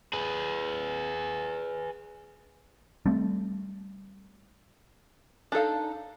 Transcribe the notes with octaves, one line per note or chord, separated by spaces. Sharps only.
G#4 B4
G3 A3 C4
D4 D#4 A4 F5